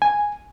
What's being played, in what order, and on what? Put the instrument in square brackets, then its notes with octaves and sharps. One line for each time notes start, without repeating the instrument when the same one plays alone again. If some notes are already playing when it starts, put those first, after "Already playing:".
[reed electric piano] G#5